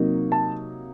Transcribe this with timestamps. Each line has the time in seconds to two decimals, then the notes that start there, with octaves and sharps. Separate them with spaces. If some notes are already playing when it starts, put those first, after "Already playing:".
Already playing: C3 F#3 A#3 D#4
0.32 A5